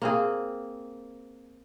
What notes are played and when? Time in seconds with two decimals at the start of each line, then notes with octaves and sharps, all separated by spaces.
0.02 A#3 C4 G#4